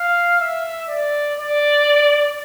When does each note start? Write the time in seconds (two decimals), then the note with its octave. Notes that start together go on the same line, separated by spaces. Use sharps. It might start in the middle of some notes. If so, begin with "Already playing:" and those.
Already playing: F5
0.40 E5
0.89 D5
1.39 D5